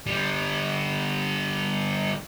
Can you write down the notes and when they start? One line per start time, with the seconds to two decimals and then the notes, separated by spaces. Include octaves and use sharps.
0.06 D3 G3